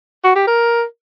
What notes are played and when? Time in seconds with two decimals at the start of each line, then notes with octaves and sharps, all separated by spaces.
0.24 F#4
0.35 G4
0.47 A#4